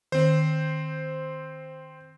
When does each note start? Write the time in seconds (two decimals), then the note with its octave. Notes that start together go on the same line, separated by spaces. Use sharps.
0.12 D#3 C4 C5